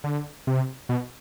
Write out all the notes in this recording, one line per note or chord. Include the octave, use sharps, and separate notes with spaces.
D3
C3
B2